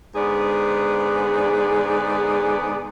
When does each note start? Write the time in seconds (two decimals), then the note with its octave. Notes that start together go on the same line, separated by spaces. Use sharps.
0.16 G#2 D3 B3 G#4 D5